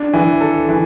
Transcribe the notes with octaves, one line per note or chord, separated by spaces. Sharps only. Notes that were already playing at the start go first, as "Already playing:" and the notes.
Already playing: D4
E3
A4
E3